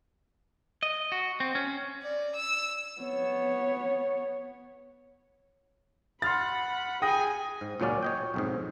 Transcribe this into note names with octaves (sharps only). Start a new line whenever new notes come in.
D#5
F#4
C4
C#4
D5
E6
B3 C#5
F#5 B5 C6 F6 A6
G#4 G5 G#5 D#6 A#6
G#2
C#2 A#2 F#3 C#4 D5
C#5 D#5 G5
B1 F2 G#2